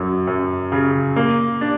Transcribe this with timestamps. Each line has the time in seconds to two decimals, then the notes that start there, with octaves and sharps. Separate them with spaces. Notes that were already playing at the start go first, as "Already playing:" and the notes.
Already playing: F#2 F#3
0.27 F#2
0.72 C#3
1.16 A#3
1.61 D4